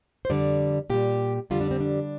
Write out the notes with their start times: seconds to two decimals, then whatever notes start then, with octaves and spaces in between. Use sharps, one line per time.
0.25 C5
0.30 F2 D3 G3 D5
0.90 A#2 G3 G4
1.50 F2 D3 G3 F4
1.61 D4
1.71 C4
1.81 D4